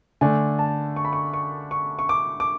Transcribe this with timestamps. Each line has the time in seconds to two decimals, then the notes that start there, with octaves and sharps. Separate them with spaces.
0.21 D3 A3 D4 G#5
0.59 A5
0.96 C#6
1.05 B5
1.13 C#6
1.34 C#6
1.71 C#6
1.99 C#6
2.09 D6
2.40 D6